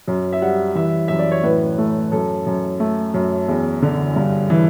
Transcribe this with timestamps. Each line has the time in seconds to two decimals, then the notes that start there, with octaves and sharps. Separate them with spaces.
0.08 F#2
0.32 E5
0.42 G3 F#5
0.75 E3 E5
1.08 F#2 E5
1.19 D5
1.31 C#5
1.43 A2 B4
1.78 A3
2.12 F#2 A4
2.46 F#2
2.80 A3
3.14 F#2
3.48 E2
3.82 D3
4.16 G2
4.50 E3